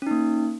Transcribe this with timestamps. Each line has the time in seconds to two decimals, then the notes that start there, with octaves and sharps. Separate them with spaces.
0.02 C#4
0.07 D#4
0.11 A#3